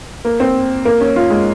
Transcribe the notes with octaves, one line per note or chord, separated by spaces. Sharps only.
A#3
C4
A#3
C#4
F4
G#3